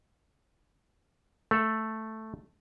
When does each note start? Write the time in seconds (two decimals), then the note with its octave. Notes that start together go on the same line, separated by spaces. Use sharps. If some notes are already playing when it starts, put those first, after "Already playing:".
1.51 A3 A4